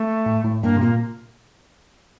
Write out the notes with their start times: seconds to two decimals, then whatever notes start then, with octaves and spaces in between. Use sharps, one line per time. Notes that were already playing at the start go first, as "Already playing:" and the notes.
Already playing: A3
0.26 A2
0.44 A2
0.63 G2 A#3
0.77 C3
0.81 A#2 A#3